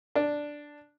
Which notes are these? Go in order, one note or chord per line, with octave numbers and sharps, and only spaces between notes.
D4